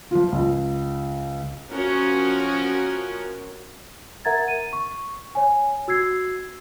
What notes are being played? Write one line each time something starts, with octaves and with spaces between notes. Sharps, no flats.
F3 F4
C#2
F3 C#4 F#4 A#4
A#4 E5 F#5 A#5 G#6 A6
D#7
C#6
C#5 G#5
F#4 E6 G#6 C7